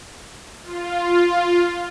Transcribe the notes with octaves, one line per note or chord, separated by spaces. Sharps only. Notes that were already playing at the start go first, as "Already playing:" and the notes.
F4